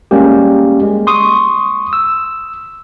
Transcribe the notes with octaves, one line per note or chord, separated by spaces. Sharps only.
G3 G#3 A#3 C#4 G4
G#3
C6 C#6 D#6
E6